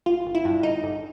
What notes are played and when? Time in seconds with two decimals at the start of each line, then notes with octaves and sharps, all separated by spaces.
0.06 G1 F4
0.26 G1
0.35 E4
0.45 G2
0.63 G1 D#4
0.83 G1